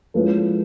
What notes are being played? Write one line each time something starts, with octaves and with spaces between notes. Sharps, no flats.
F3 G#3 C#4 E4 A4 B4